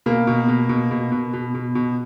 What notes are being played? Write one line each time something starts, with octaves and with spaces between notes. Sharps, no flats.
B2 A#3
B2
B2
B2
B2
B2
B2
B2
B2